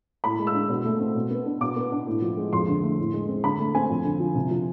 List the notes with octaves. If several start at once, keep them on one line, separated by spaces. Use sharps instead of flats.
A2 B5
G#3
E6
D4
B2
A3
C4
B2
B3
D4
B2 D6
B3
D4
A2
F3
G#3
F2 C6
D3
A3
A2
G#3
C4
D3 B5
A3
C4 G#5
F2
D3
F3
C3
F3